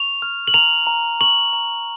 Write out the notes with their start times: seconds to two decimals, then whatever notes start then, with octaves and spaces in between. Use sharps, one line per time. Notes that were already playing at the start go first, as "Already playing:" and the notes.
Already playing: C#6 F7
0.22 F6
0.48 F#7
0.54 A#5 F7
0.87 A#5
1.20 C#6 F#7
1.53 A#5